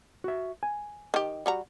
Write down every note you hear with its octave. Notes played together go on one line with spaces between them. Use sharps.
F#4 E5
G#5
D#3 G4
G3 F#4 A#5